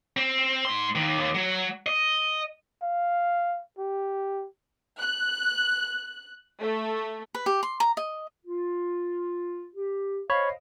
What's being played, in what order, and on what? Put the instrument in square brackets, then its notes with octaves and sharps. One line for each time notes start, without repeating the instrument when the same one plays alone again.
[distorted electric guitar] C4
G#2 C6
D#2 D#3
D#2
F#3 F#4
D#5
[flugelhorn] F5
G4
[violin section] F#6
A3
[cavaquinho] B4
G4
C6
A#5
D#5
[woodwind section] F4
G4
[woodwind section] C5 D#5 F5 [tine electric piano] C#5 B5